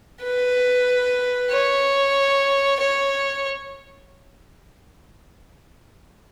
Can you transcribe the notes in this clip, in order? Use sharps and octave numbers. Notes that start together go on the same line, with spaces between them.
B4
C#5
C#5